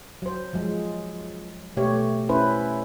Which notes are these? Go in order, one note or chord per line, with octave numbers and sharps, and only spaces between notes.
F#3 C5
F3 F#3 G#3
B2 A3 G4 C#5
C#4 E4 B4 C5